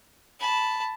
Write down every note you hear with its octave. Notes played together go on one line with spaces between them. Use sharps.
A5 B5